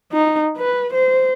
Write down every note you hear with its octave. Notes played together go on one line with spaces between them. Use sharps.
D#4
B4
C5